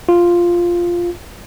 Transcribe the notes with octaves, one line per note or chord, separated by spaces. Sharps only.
F4